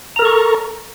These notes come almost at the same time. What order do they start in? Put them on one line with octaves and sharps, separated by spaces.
A#5 A#4 A4 C#6